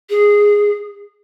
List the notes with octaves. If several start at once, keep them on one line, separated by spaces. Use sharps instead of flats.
G#4